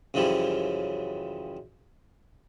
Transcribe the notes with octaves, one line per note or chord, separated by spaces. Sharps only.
F#2 C#3 E3 F3 G3